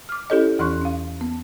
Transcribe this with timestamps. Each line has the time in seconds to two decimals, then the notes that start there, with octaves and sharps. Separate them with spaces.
0.09 D6 F6
0.30 C#4 E4 G4 A4 C#5 D#5
0.59 E2 E3 C#4 C6 C#6 F#6
0.81 C#4 F5
1.21 B3